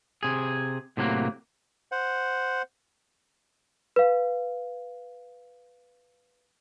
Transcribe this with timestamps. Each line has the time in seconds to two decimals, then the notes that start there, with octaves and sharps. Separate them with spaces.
0.23 C3 G#4
0.97 A2 C3 F#3 G#3 A#3
1.92 C5 F#5
3.96 B4 F5